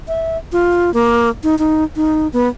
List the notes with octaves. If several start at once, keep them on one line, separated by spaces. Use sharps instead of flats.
E5
F4
A#3
D#4
D#4
D#4
B3